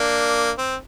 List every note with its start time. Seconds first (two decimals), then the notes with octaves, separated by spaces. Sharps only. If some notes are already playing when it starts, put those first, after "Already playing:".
Already playing: A#3 D4
0.58 C4